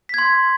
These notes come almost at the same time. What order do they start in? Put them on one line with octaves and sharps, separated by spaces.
B6 G#6 C6